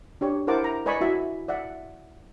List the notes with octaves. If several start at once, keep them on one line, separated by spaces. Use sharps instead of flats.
D4 G4 C#5
E4 A#4 C5 F#5 A5 D6
A#5
B4 D5 D#5 G#5 B5 C#6
E4 F#4 E5
D5 E5 F#5